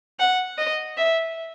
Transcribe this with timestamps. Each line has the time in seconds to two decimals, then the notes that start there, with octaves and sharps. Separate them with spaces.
0.20 F#5
0.58 D#5
0.97 E5